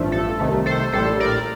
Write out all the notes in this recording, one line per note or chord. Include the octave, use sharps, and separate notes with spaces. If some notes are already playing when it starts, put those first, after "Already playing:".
Already playing: A1 G2 F3 A3
A4
C2 C3 D#3 A3
A4 C5
A#1 A2 G3 A4 C5
A#4 D5